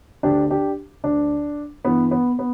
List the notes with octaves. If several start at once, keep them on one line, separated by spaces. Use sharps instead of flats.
D2 D3 D4 G4
D4 G4
D2 D3 D4
G2 E3 B3
B3
B3